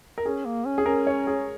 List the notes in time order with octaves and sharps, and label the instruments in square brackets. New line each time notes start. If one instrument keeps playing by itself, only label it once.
[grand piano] A#4
[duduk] C#4 [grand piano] G#4
[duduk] A#3
C#4
[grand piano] G#4
[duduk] C#4 [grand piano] A#4
[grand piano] C#5
G#4